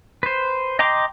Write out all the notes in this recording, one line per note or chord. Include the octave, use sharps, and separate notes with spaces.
B4 C5
D#5 G5 A#5 C6 D6